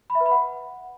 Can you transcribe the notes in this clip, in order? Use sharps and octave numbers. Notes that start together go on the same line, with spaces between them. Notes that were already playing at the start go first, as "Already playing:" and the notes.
B5
E5
B4
B5
F#5